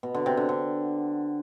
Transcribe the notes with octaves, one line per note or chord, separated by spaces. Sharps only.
B2
D3
C3
D3
D3